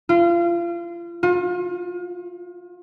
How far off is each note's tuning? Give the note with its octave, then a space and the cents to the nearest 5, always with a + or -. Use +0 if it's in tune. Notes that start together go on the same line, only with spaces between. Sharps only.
F4 -30
F4 +35